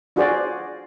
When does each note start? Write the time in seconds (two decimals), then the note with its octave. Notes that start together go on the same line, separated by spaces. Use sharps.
0.16 D4 F4 F#4 G#4 C5 D5